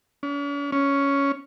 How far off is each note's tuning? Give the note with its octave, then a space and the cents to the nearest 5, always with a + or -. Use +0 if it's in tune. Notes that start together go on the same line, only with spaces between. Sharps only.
C#4 +45
C#4 +5